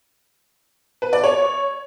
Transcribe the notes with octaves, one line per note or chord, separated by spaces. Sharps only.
B4
D5
C#5